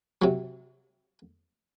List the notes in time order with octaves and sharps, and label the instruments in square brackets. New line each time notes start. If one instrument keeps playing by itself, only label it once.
[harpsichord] C3 F#3